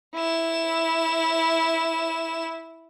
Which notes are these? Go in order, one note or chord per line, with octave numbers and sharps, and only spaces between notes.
E4 E7